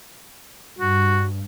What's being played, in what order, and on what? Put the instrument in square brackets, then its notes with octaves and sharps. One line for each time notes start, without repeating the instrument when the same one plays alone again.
[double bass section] G2 [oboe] F#4